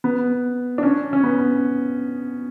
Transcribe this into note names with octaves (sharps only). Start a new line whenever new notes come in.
B3
D4
C#4
C#4
B3